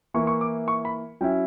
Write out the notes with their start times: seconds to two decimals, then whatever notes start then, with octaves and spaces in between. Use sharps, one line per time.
0.14 E3 A#3 E4 C#6
0.27 C#6
0.41 D6
0.68 C#6
0.85 B5
1.21 F#3 C#4 E4 G5